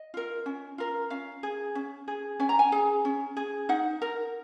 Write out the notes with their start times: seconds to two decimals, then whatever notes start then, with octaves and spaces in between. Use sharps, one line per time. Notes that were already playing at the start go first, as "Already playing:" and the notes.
Already playing: D#5
0.14 F4 A#4
0.46 C#4
0.78 F4 A#4
1.10 C#4 F5
1.43 G#4
1.75 C#4
2.08 G#4
2.40 C#4 G#5
2.49 A#5
2.59 G#5
2.72 G#4
3.05 C#4
3.37 G#4
3.69 D#4 F#5
4.02 A#4